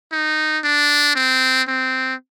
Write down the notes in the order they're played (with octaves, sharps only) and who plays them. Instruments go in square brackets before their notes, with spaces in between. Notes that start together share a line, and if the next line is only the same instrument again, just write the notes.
[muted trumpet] D#4
D4
C4
C4